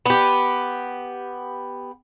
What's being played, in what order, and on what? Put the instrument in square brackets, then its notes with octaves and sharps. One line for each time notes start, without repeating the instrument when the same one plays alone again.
[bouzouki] B3 G4